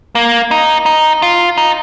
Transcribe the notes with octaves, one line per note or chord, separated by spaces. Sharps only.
A#3
D#4
D#4
F4
D#4